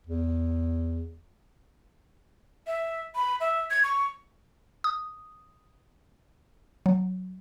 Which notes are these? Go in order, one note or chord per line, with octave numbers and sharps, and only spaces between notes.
E2
E5
B5
E5
G#6
C#6
D#6
F#3